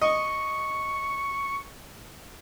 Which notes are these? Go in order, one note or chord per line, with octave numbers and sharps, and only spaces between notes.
D#5 C#6